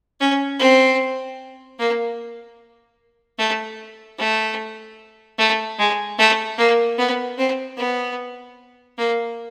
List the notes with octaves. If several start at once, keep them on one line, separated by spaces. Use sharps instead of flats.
C#4
C4
A#3
A3
A3
A3
G#3
A3
A#3
B3
C4
B3
A#3